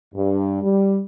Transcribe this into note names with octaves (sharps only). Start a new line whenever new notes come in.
G2
G3